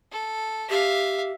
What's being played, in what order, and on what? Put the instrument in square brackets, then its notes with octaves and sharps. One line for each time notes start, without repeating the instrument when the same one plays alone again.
[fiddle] A4
[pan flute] G4 [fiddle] E5 F5